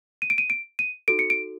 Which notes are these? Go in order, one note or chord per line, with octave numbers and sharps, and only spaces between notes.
D#7
D7
D#7
D7
D#7
D#4 F#4 A4 D7
C#7
D7